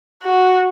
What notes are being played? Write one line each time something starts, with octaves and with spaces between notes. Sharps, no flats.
F#4